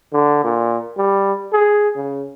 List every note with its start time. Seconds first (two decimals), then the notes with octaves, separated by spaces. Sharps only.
0.13 D3
0.44 A#2
0.97 G3
1.52 G#4
1.96 C#3